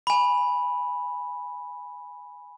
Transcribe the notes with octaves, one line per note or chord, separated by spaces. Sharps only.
G#5 B5